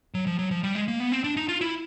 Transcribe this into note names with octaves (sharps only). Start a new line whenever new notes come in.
F#3
F3
F#3
F3
G3
G#3
A#3
B3
C4
D4
D#4
F4
E4